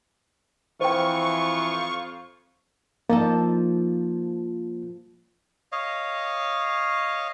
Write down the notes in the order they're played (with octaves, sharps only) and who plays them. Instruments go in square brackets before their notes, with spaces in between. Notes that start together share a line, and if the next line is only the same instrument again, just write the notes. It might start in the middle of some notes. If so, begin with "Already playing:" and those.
[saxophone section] F2 F4 F5 [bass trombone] E3 [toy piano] C5 G5 [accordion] C#6
[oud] F3 D#4 A4 [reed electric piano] A#3
[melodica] C#5 D#5 F5